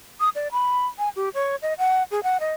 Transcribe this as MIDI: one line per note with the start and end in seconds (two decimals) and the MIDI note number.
0.20 0.29 87
0.35 0.48 74
0.52 0.87 83
0.98 1.09 80
1.16 1.29 67
1.34 1.55 73
1.62 1.73 75
1.78 2.03 78
2.11 2.23 68
2.23 2.38 78
2.40 2.54 75